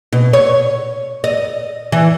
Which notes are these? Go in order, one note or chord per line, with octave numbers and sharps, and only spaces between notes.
B2
C#5
D#5
E3